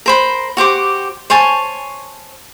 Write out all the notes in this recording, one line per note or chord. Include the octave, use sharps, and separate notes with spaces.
A#4 C5 B5
F#4 G4 C5 D6
C5 C#5 G#5 A5